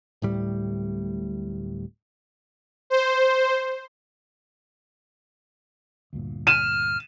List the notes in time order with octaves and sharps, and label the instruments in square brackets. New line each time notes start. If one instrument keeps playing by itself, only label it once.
[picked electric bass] D1 A2 G3
[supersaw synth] C5
[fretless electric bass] D2 G2 A#2
[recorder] F6 [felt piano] D#7 E7